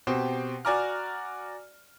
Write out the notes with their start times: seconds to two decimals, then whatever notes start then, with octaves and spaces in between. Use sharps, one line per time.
0.07 B2 C4 G4 C5
0.65 F#4 D5 G#5 A#5 D6 F6